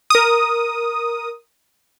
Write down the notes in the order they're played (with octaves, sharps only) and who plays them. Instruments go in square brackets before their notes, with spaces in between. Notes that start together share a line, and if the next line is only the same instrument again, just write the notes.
[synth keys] A#4 D#6